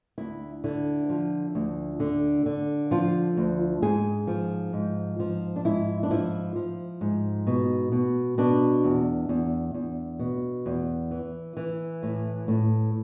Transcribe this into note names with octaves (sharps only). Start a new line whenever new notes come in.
D2 E4
D3 E4
F3
D2
D3
D3
F3 F4
D2
G#2 G#4
F3
G#2
F3
D4
G#2 E4
D4
F3 E4
F3
G#2
B2
B2
B2 D4
E2
E2
E2
B2
E2
E3
E3
A2
A2